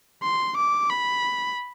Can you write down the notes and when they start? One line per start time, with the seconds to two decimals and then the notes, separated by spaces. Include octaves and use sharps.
0.23 C6
0.57 D6
0.90 B5